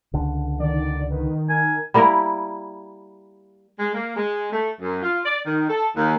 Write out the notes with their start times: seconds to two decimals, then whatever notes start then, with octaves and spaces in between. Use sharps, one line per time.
0.14 C#2 D3
0.60 D#3 D5
1.11 D#3 B4
1.49 D#3 A#4 G#5
1.94 G3 A#3 E4 A#4
3.79 G#3
3.94 A#3
4.17 G#3
4.51 A3
4.80 F#2
5.03 F4
5.24 D5
5.46 D#3
5.69 A4
5.96 D#2